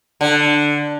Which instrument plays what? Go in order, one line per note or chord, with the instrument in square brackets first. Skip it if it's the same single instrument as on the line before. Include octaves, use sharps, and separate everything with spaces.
[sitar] D3